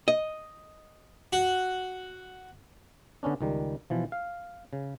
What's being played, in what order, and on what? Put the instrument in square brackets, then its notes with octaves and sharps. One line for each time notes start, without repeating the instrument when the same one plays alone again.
[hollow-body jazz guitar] D#5
[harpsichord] F#4
[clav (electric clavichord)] D3 B3 C#4 D4
C#2 D#3 G3
B2 E3 F3
F5
C#3